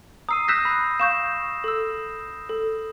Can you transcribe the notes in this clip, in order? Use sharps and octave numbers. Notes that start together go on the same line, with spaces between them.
A#5 D#6 E6 C7 D#7
E6 F#6 G6 A#6 B6 E7
B5
F5 C#6 G6 E7
A4 E6
A4